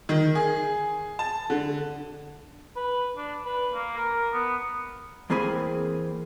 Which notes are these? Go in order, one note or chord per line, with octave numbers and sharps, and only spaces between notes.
D#3
G#4
A5
D3
B4
D4
B4
A#3
A#4
B3
E2 E3 A#3 C4 G#4 B5